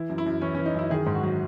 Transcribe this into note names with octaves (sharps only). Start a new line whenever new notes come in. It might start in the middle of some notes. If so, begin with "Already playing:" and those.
Already playing: E3 E4
F#2
E4
F#2
E3 C#4
E3 C#4
D#4
F#2 E4
D#3 G#4
G#2
F#4
F#3